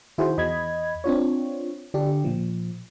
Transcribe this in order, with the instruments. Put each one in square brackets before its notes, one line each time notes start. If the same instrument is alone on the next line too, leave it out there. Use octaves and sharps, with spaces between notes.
[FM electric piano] D#3 E4 F#4 G#4 C5
E2 D#5 B5 G#6
C4 D4 F4 C#5
D3 D4 G4
A#2 F3